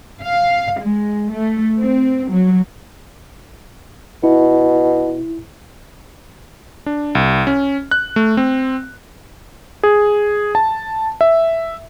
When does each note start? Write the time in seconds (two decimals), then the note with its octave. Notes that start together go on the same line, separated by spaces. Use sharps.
0.23 F5
0.81 G#3
1.31 A3
1.79 C4
2.30 F#3
4.24 B2 E4
6.86 D4
7.15 C2
7.47 C#4
7.91 F#6
8.16 A3
8.37 C4
9.83 G#4
10.55 A5
11.21 E5